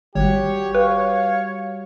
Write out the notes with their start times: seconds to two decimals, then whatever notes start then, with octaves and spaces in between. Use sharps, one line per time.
0.15 G#1 G3 F#4 G4 C#5
0.75 B4 F5